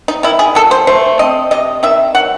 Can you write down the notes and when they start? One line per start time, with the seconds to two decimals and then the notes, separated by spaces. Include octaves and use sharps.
0.08 D#4
0.23 D#3 E4
0.39 G#4
0.55 F#3 A4
0.71 C5
0.87 A3 C5
1.19 C4 D#5
1.51 C3 D#5
1.83 D#3 E5
2.15 F#3 F#5